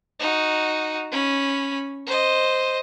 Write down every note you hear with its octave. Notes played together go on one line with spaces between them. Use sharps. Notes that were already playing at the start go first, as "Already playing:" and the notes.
D#4 F#4
C#4 B5
C5 D#5